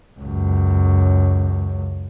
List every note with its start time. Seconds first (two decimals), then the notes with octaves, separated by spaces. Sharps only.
0.20 C#2 F#2